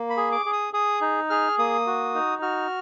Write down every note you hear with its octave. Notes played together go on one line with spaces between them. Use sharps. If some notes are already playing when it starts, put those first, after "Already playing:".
Already playing: A#3
B5
G#4
D6
G#4
D#6
G#4 D#6
D#4
G#4 F6
A#3 D#6
F#4
D#4
F#4 F6